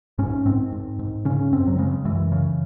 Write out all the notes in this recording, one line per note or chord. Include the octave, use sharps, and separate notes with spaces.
G#2 C#4
G#2 C4
G#2
G#2
C#3 C#4
F#2 C4
F#3
C#3 G#3
F#2 E3
C#3